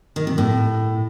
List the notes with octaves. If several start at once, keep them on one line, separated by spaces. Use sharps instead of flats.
D#3
C3
A2